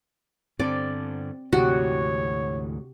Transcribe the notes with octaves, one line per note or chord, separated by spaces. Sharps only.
G2 D3 C4 D5
D2 G#2 C3 E3 F#4 G4 C#5